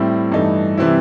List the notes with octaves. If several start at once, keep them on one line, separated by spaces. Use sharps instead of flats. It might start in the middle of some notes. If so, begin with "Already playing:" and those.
Already playing: A2 G3 C4 E4
G2 E3 A3 D#4
C3 E3 G3 C4 E4